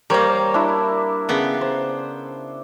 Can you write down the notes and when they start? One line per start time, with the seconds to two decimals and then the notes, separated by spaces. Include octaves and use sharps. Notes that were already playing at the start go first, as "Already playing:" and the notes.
0.10 G3 A#3 A#4 C5 C#5
0.54 D4 E4
1.29 C#3 B3
1.61 C5